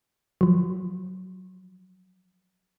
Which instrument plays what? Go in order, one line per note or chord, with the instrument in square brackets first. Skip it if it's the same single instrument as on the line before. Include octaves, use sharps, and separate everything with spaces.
[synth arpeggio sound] F3 F#3